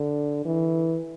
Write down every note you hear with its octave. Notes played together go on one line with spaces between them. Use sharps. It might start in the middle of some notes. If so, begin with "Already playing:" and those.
Already playing: D3
E3